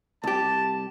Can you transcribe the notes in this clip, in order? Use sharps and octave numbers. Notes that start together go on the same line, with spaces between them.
C2 G4 A5